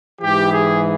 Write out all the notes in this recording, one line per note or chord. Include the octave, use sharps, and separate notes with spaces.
G#2 E3 G4
G#4